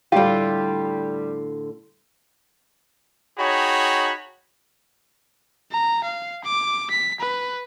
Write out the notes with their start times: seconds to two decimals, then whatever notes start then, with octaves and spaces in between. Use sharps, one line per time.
0.12 A2 D3 G3 F4 G4
3.38 D#4 F#4 G#4 C#5 G5 B5
5.72 A#5
6.04 F5
6.44 D6
6.90 B6
7.20 B4